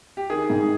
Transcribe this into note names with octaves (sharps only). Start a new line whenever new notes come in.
G4
D#3 G#4
G#2